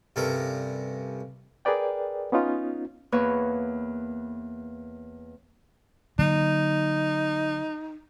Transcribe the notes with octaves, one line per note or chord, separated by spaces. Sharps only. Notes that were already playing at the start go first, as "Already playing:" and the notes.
G2 C3 C#4 A4 A#4 A#5
G#4 A#4 B4 D5 G5
B3 C#4 D#4 F4
E2 A#3 B4 C#5
D3 F#3 A#3 D#4